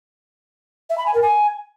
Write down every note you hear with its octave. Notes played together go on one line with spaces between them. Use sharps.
E5
B5
G#5
A#4
G#5